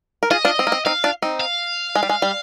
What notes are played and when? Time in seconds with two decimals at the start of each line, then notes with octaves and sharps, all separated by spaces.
0.23 A#4
0.31 F4 G#4 D#5
0.45 D4 F4
0.59 C4
0.67 A#3
0.72 C4
0.85 C4 D#4 F5
1.04 D4 F4
1.22 C4 D#4
1.41 F5
1.95 G#3
2.03 G3
2.09 G#3
2.22 G3